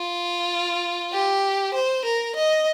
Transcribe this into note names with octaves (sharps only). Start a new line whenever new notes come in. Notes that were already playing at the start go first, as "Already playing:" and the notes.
Already playing: F4
G4
C5
A#4
D#5